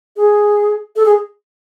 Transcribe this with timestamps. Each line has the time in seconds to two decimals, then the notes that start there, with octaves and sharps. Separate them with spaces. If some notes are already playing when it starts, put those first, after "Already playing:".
0.16 G#4
0.96 A4
1.05 G#4